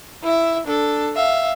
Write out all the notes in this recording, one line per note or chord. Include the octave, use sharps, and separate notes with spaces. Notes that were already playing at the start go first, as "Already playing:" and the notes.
E4 E5
D4 A4
E5 F5